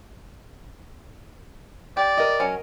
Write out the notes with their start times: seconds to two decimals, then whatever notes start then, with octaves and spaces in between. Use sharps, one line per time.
1.97 G4 D5
2.18 A#4 D#5
2.40 F#3 C#4